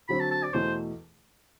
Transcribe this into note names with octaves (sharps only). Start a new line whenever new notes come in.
D3 F#3 C4 F#4 B5
A5
A5
D5
E2 B2 A3 C5